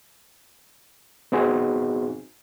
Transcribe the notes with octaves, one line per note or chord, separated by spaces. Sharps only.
B3 C4 D#4 F#4 G#4